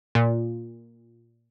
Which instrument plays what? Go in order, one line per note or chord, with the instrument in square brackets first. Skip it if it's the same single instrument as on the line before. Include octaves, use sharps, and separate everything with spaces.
[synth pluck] A#2